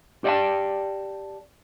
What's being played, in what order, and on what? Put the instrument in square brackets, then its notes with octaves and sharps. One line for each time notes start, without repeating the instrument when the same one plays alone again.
[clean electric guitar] G4 D5 D#5 F5 G5 A5